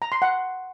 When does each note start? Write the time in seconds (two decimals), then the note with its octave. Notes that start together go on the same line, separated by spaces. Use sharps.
0.02 A#5
0.12 C6
0.22 F#5